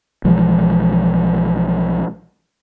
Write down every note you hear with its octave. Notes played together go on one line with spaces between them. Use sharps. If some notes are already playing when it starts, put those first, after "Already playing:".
B1 E3 F3 G#3